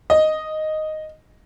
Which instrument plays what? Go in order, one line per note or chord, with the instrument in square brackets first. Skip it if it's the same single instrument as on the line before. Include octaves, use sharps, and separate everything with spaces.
[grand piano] D#5